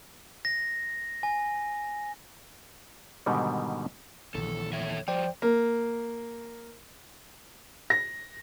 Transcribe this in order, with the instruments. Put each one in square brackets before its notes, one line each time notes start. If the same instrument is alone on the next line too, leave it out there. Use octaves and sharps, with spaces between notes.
[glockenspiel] A#6
G#5
[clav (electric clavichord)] G#2 B2 D3 D#3 G3
[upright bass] A#1 [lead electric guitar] D#2 E3 [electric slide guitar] A4
[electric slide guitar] A4 C#5 E5
[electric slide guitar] F3 G3 [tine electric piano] C5 D5 G5
[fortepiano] A#3
[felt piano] A#6